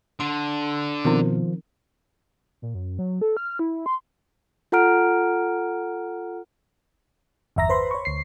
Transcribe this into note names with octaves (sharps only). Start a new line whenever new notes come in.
D3 C6
B2 D#3 F3 C4 D#4 A#4
A#2
F#2
F#3
A4
F6
E4
C6
F4 A4 F#5 A#5 F6 D7
G1 E2 E5 A#5 A#6
B4 C5 B5 C6
C#5 C#6
D2 C7